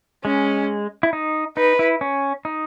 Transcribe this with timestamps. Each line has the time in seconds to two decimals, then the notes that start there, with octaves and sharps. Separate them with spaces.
0.24 G#3 C#4
1.03 E4
1.13 D#4
1.57 D#4 B4
1.79 E4
2.01 C#4
2.45 D#4